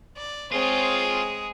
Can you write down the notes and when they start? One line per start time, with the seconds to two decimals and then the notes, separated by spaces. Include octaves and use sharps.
0.16 D5
0.52 G#3 C4 F4 G#4 C#5